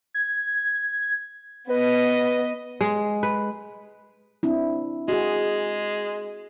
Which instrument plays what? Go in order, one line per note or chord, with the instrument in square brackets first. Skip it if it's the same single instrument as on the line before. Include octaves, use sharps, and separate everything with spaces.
[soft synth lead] G#6
[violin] B3 D#5 [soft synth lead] B4
[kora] G#3
B4
[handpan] C4 D4 E4
[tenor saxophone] G#3 [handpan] F#4 G#4